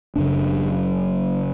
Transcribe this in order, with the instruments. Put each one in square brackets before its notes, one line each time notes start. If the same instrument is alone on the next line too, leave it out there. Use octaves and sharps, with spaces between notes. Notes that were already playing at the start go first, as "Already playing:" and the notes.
[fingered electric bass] F#1 F#2 C#3 D4